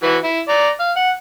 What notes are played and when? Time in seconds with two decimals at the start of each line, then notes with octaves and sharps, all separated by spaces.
0.03 E3 F#4 B4
0.24 E4
0.49 D5 A#5
0.80 F5
0.96 F#5